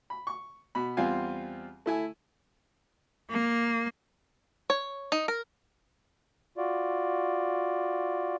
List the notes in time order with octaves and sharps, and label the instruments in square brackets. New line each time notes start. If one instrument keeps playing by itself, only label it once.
[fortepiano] B5
C#6
B2 B5
E2 G3 C4 F4 F5 G#5
A3 E4 G#5
[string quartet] A#3
[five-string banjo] C#5
D#4
A#4
[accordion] F4 F#4 D5